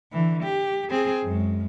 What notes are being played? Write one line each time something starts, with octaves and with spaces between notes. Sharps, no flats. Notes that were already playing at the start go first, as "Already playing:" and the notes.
D3 E3
G4
C4 G#4
F#2 G#3